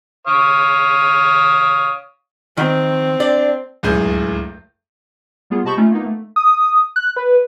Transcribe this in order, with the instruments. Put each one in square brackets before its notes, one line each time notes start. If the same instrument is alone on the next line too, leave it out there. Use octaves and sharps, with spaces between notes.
[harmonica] C#5 F5 D#6
[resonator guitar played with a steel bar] D#3 [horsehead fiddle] C4
[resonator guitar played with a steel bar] D4 D5
[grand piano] D1 C#2 F#2 G#4 G#5 G6
[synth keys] G3 A#3 B3 F4 G#4
C3 D#5 A5 B5 C#6 G6
A3 C#4 D#4 F4
A#3 B3 D#4
A3
[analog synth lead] D#6
F#6
B4